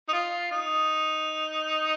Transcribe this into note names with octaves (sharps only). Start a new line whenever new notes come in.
D#4
F4
D#4